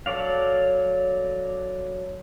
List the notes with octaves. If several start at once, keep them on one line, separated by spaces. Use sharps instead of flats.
F#3 A4 C#5 D5 F5